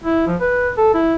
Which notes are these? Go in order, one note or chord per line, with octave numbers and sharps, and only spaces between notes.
E4
F3
B4
A4
E4